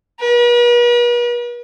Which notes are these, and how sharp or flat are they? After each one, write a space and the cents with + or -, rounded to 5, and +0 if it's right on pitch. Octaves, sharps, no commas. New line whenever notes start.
B4 -45